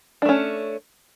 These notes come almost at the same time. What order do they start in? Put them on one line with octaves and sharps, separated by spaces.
D4 A3 C#4